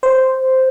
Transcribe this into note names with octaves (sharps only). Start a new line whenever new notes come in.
C5